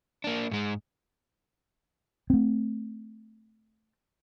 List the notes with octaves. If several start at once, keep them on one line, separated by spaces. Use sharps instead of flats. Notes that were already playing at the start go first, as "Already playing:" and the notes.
A#3 D4
G#2 G#3
A3 C4